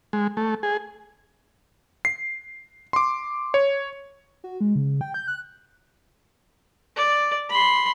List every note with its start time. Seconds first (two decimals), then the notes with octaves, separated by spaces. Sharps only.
0.13 G#3
0.37 A3
0.63 G#4
2.05 C7
2.93 C6 D6
3.54 C#5
4.44 F#4
4.61 G#3
4.76 C#3
5.01 G5
5.14 G6
5.28 F#6
6.96 D5
7.49 B5 C6